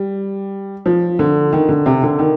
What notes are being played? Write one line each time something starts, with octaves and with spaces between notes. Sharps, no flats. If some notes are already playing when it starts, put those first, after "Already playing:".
Already playing: G3
F3
D3
D#3
D3
C3
D3
D#3